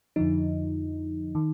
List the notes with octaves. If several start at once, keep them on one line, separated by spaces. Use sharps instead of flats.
F2 D3 F3 D#4
D#3